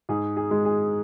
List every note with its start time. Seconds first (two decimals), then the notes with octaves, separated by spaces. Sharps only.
0.09 G#2 G#4
0.37 G#4
0.51 G#3
0.65 G#4